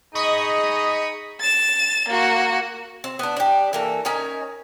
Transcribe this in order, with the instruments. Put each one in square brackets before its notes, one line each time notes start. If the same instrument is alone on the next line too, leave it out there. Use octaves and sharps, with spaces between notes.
[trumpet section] D#4 G#4 [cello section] D#5 [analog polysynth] B5 C#6 D#6
[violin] A6 E7
A#3 F#4
[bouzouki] C4
B3 D4
D4 G4
E3 A#3 A4
C#4 D#4 A#4 C#5